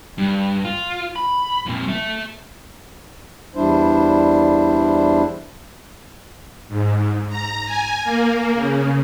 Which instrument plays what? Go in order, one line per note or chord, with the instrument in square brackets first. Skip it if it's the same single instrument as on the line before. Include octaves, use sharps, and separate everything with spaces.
[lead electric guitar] G2
F4
B5
F2 A#2
A3 E5
[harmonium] E2 G3 D4 E4 C5
[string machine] G#2
A#5
G#5
A#3
C#3